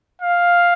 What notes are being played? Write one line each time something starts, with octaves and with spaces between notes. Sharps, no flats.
F5